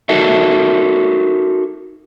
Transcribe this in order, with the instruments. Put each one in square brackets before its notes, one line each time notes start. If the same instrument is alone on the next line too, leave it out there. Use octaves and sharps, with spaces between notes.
[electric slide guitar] D#4 F#4 A4 A#4 E5